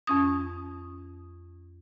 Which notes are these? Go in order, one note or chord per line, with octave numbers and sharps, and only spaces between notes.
F2 C#4 D#6